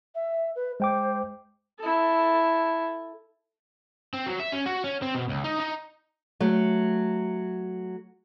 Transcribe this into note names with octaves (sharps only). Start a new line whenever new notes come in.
E5
B4
G#3 C5 G5 D6
E4 A4
C4
F#3
E5
C#4
F#4
C#4
C4
B2
C#2
D#4
D#4
F#3 A3